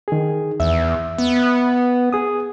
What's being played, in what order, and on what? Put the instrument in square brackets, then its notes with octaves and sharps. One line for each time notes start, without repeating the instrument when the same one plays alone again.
[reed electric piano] D#3 G#4
[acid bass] E2 [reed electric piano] E5
[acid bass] B3
[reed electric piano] G#4 D#6